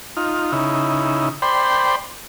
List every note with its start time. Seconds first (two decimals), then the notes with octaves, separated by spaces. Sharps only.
0.17 D#4 F4
0.52 C#3 D#4 E4
1.42 C5 D5 G5 B5 C6